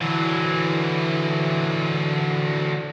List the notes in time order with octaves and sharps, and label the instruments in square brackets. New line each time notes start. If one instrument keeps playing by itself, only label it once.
[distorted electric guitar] D3 F#3 [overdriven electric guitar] E3